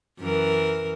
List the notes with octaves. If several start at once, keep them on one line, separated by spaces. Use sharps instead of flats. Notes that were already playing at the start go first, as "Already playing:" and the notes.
F#2 E3 A#4